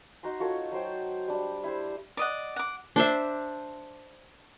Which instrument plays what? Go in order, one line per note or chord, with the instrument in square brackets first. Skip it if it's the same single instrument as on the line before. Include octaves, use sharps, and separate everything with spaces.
[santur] D#4 F#4 A#5 C6
F4 F#4 A4 C#5
F#3 C5 G5
G3 D4
E4 G4 C5
[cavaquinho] D5 D#5 F#5
F#5 D6
[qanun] D4 C5 E5